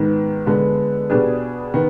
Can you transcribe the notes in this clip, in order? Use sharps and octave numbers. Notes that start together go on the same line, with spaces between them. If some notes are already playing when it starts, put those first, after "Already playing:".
Already playing: G#2 D#3 B3
D3 G#3 B3
B2 G3 D4 G#4 B4
D#3 B3